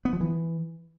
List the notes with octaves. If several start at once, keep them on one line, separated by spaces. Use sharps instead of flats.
B3
F3
E3